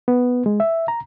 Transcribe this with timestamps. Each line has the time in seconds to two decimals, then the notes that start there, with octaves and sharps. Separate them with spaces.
0.08 B3
0.46 G#3
0.60 E5
0.88 A#5